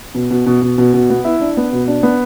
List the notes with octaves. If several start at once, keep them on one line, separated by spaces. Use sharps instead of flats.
B2
B2
B2
B2
B2
B2
B3
E4
D4
B3
B2
D4
B3